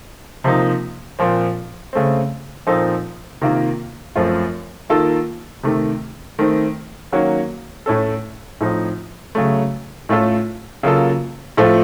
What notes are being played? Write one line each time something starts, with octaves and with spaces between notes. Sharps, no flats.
C3 F3 A#3 D#4
A#2 F3 C4
C#3 A3 C4
A#2 F3 C4 D#4 A4
C3 D#3 A#3 F4
F#2 F3 A3 C4 F4
D#3 A#3 F4 A4
C3 D#3 A3
D#3 A3 C4
D#3 F#3 A#3 C#4 F#4
A2 A3 C#4 A4
A2 F3 C4 D#4
C#3 F#3 A3
A2 A3 C#4 F4 A4
C#3 F#3 A#3 F4 A4
A2 F3 A3 C4 F4